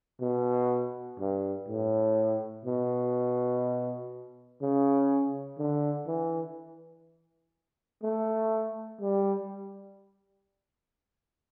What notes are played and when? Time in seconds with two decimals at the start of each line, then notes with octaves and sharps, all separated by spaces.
0.21 B2
1.20 G2
1.69 A2
2.65 B2
4.61 C#3
5.59 D3
6.07 E3
8.03 A3
9.01 G3